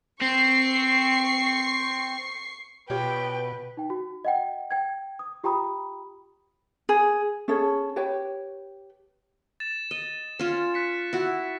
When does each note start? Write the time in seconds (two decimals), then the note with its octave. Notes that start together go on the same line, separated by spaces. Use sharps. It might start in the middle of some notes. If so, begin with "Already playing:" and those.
0.21 C4 C#6 C7
2.90 B2 F4 G4 B4 C#5 G5
3.77 D#4 G5
3.90 F#4
4.25 D#5 F#5 G5
4.71 G5 G#6
5.19 D#6
5.44 F4 G4 G5 A#5 B5 D#6
6.89 G#4
7.48 C#4 G#4 A4 C#5
7.96 G4 B4 C#5 G5
9.60 A6 E7
9.91 D#5
10.39 C#4 F4
10.74 F#6 B6 C#7
11.13 E4 F#4